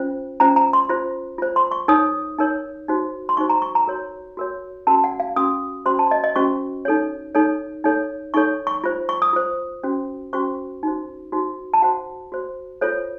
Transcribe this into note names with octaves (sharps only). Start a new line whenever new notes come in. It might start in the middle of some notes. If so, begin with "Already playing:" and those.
Already playing: C#4 F4 C5
C#4 F4 C5 A#5
A#5
C6
F4 C5
F4 C5
C6
C#6
D#4 A#4 C#5 D#6
D#4 A#4 C#5
D#4 F#4 C5
C6
D#4 F#4 C5 C#6
A#5
C#6
A#5
F#4 A#4 C#5
F#4 A#4 C#5
C#4 F#4 A#4 A5
F#5
F5
C#4 F#4 A#4 D#6
C#4 F#4 C5 C6
A5
D#5
D#5
C#4 F#4 C5 C#6
D#4 A4 C#5
D#4 A4 C#5
D#4 A4 C#5
D#4 A4 C#5 C#6
C#6
F4 C5
C#6
D#6
F4 C5
C#4 F#4 C5
C#4 F#4 C5 C#6
D#4 F#4 C5
D#4 F#4 C5
A5
F#4 C5 F#5
F#4 C5
F4 A4 C5 C#5